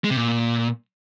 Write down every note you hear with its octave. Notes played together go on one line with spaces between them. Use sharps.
G#3
C3
A#2